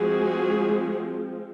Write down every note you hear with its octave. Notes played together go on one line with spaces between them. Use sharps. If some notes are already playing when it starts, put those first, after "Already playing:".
Already playing: F3 G#3 C4 F#4 G#4